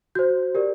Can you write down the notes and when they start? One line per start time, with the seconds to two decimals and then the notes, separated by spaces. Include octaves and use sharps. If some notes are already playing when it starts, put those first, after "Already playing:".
0.15 F#4 C5 G6
0.55 G4 A#4 D5